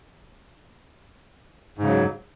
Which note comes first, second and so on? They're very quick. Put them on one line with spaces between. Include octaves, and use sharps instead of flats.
G#2 C#3 F#3